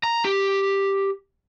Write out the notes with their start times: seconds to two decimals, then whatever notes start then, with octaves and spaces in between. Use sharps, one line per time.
0.03 A#5
0.25 G4